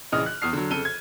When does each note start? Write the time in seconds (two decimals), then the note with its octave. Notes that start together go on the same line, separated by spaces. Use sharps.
0.12 A#1 C#3 E3 D#5 D#6 F6
0.26 F#6
0.42 E2 D#6 F6 C7
0.53 D3 F#3
0.70 F2 C#3 A4 D#7 G7
0.85 G#6